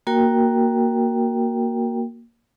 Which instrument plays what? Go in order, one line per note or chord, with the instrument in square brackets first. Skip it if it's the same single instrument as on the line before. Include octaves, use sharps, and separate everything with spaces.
[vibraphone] A#3 F#4 A#4 G5